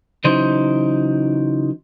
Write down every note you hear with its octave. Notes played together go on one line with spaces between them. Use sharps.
C#3 E3 F#3 D#4 C5